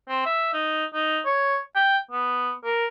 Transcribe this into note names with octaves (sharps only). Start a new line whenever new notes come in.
C4
E5
D#4
D#4
C#5
G5
B3
A#4